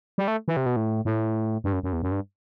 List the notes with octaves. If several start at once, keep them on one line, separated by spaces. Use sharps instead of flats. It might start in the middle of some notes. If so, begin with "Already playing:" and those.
G3
A3
E3
C3
B2
A2
A2
G2
F#2
F#2
E2
F#2
G2